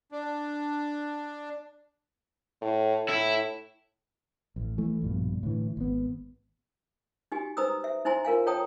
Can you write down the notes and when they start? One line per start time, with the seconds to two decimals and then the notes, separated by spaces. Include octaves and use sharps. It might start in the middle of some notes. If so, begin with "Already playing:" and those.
0.12 D4
2.62 A2
3.09 A2 E4
4.56 A1
4.78 E3 A3
5.01 A#1 G2 B2
5.43 A2 D3 E3
5.77 G#1 B3
7.32 D#4 F#4 G4 G#5
7.57 D#4 B4 C5 A#5 D#6 E6
7.84 E5
8.05 D#4 E4 C5 G#5 A#5 C6
8.25 F4 A#4 F5 G#5
8.46 A4 C#5 G5 A5 A#5 D#6